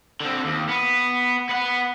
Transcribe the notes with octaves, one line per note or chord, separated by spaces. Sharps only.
D3 C4
D#2
B3
B3 F#5